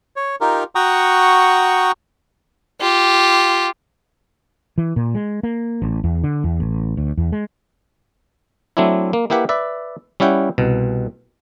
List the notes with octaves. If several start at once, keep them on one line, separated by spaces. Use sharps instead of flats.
C#5
D#4 F4 G4 A#4
F#4 F#5 G5 A#5 C#6 D#6
F4 G4
E3
A#2
G#3
A#3
A1
E2
D3
E2
A1
D2
E2
G#3
F#3 A3 C4 D4 E4
A#3
A#3 E4 G4 B4 F#5
B4 D5 E5
G3 C#4 E4 F#5 G5
C2 B2